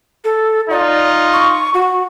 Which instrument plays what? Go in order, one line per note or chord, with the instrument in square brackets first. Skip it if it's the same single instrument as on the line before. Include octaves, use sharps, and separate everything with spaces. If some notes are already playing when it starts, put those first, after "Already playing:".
[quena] A4
[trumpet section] D#4 F4 [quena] D5
[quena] C#6
F#4